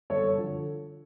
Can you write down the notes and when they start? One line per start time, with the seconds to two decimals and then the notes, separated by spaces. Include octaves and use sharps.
0.10 G1 A4 C#5
0.38 D3 F3